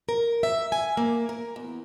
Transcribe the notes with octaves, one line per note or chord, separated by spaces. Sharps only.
A#4
E5
G#5
A#3
A#4
E2